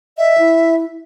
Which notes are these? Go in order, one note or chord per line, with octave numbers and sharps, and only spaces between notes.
D#5 E5
E4